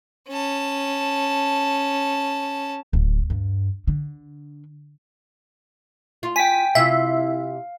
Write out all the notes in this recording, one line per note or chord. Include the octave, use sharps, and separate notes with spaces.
C#4 A5
D1
G2
D3
F4
G5 G#5 B6
C3 E4 F4 E5 F5